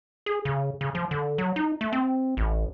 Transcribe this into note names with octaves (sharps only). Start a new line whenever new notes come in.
G#4
C#3
C#3
F3
D3
F#3
D#4
A3
C4
A1